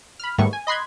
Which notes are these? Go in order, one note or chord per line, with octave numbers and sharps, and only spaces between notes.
B5 F6
G#2 D#3 G3 A3 B3 C#6
G#5
D#5 B5 C6 F#6 G#6